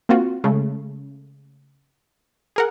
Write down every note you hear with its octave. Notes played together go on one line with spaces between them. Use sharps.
A#3 C4 F4 F#4
C#3 G#3 A3
G#4 A#4 F#5